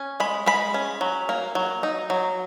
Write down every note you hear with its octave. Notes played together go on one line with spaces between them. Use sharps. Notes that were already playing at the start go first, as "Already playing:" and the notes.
Already playing: C#4
G#3 B5
G#3 B5
C#4
F#3
A#3
F#3
D#4
F#3